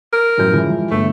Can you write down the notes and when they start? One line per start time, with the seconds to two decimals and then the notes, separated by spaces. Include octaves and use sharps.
0.13 A#4
0.38 A1 F#2 G6
0.52 E3 F3 G#3
0.91 G1 A3